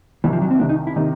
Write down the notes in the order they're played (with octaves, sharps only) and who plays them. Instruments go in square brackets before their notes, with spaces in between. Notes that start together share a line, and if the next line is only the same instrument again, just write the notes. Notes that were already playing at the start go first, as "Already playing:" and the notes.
[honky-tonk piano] C2 C3 D#3 [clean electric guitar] E3
[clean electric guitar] F3
F#3
C4
[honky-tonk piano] C2 C3 D#3 [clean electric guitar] D4
[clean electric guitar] D#4
E4
[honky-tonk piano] C3 D#3 [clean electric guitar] D#4